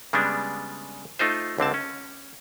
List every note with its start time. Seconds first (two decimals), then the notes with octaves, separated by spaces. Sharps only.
0.13 C#3 G3 G#3 B3 D4
1.19 A3 D#4 F4 C5
1.58 C#2 D3 C4 A5
1.74 C#4